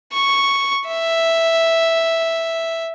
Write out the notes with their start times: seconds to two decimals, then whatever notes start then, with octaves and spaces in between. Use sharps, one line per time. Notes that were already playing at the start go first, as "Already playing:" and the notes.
0.13 C#6
0.87 E5